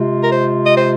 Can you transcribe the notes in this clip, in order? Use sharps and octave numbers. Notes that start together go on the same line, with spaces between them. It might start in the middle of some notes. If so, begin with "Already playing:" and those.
Already playing: C3 G#3 F4
A#4
C5
D#5
C5